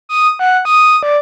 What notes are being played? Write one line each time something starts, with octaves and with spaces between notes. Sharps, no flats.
D#6
F#5
D#6
D5